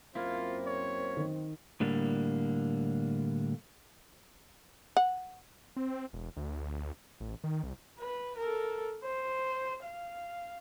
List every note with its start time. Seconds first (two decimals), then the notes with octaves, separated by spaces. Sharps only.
0.15 F#2 A#3 C4 E4 F4 C5
0.66 C#5
1.17 D#3
1.80 A2 D3 G3 A#3
4.97 F#5
5.76 C4
6.13 E1
6.37 D2
7.20 A1
7.44 D#3
7.63 C2
8.00 B4
8.37 A4 A#4
9.04 C5
9.83 F5